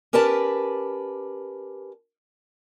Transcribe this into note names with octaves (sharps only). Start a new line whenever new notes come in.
C#4 G4 A#4 B4 D5 A5